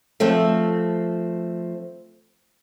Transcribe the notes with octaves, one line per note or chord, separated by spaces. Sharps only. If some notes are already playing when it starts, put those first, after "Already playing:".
F3 A3 C4